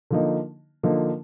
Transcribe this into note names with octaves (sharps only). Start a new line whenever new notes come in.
D3 F3 A#3 D#4
D3 F3 A#3 D#4